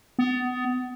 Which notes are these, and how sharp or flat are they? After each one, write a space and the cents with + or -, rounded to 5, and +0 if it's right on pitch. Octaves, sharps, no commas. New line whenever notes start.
B3 +25